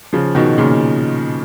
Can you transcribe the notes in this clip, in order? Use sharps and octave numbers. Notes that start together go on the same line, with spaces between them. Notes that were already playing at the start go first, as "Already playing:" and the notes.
C#3 F3
B2 D#3
A#2 C#3